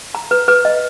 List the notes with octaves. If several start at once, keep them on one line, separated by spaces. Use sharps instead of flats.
A#5
B4
B4
D#5